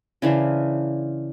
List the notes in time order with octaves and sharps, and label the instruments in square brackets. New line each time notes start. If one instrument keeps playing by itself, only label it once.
[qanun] C#3 E3 D4 C5